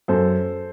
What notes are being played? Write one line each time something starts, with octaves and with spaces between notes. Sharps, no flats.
F#2 A4 C5